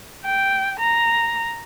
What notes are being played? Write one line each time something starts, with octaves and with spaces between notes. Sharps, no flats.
G5
A#5